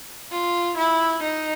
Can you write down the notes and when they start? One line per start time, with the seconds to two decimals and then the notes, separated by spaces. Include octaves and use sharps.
0.32 F4
0.77 E4
1.23 D#4